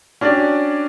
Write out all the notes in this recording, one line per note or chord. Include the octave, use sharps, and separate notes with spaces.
C#4 D4 F#4 G4 D5